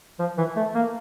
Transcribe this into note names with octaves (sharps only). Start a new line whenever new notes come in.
F3
E3
A3
A#3